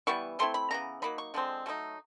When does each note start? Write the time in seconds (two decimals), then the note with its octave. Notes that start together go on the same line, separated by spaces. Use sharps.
0.07 E3 G3 B3 E4 C#6
0.39 F3 A3 C4 E4 C6
0.54 B5
0.71 C#3 E3 B3 A#5
1.02 F#3 A#3 D#4 B5
1.18 C#6
1.34 D3 F3 G#3 C4
1.66 F#3 A3 C4 D#4